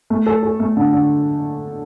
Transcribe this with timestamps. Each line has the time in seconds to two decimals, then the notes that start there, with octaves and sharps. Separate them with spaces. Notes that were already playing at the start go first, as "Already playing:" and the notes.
0.10 A3
0.26 A4
0.43 A4
0.60 A3
0.77 D3
0.93 D3